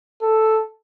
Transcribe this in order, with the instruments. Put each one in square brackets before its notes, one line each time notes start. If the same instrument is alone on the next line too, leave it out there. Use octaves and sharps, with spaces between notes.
[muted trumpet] A4